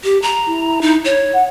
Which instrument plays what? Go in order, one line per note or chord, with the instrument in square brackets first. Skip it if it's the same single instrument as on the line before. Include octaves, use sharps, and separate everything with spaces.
[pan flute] G4
A#5
[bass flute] E4
[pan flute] D#4
C#5
[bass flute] F#5